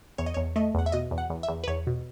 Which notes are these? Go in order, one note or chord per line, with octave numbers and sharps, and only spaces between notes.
E2 C#5
D#5
E2 C#5
A3 D#5
E2 F#5
E5
B2 D#5
E2
F#5
E2
E5
E2
B4
E2 C#5
B2